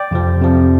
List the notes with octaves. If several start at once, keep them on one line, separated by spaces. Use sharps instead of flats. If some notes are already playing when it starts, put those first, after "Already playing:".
Already playing: D5 G5
F2 C3 F3
F2 C3 F3